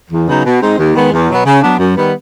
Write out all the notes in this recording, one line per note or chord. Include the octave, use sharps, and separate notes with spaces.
E2
C#3 F#3 B3 D#4
B2
G#3 C4 D#4
D#2
D#3 G#3 B3
E2
B2 F#3 B3
C#3
F#3 B3 D4
F#2
D#3 G3 B3